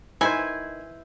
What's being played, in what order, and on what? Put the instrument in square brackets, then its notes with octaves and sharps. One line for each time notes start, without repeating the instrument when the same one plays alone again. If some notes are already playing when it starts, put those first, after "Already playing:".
[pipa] D#3 G#5 [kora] E4 B4 C5